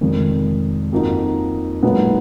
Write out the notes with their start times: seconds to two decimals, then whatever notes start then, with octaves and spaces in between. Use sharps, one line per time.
0.01 F1 F2 D#3 G#3
0.92 F2 F3 A#3 D#4 F#4
1.83 B1 A#2 G#3 B3 D#4